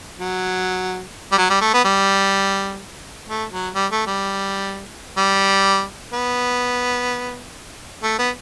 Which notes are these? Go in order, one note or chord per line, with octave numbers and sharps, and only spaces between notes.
F#3
G3
F#3
G3
A3
B3
G3
A3
F#3
G3
A3
G3
G3
B3
A3
B3